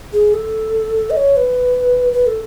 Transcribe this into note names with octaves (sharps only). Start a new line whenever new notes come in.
G#4
A4
D#5
C#5
B4
B4
A4